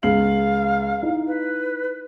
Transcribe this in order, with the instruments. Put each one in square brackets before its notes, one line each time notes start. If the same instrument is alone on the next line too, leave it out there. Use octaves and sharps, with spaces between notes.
[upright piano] C#2 C7 F#7 [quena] F5
[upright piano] D#4 E4
[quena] B4